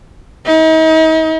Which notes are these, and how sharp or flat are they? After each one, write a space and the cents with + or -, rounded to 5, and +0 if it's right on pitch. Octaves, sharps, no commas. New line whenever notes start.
D#4 +40